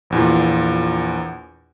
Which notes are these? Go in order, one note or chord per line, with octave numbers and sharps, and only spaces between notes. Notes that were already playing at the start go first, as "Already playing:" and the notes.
A#1 E2 A#2